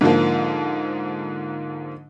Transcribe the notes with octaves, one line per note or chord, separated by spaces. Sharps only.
G#2 D3 F3 A#3